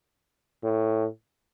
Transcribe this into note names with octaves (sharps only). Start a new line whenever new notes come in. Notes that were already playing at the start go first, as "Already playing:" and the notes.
A2